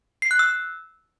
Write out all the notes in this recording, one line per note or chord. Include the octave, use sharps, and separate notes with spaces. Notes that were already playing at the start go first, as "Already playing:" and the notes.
C7
F#6
E6